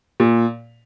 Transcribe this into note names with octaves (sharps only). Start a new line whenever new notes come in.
A#2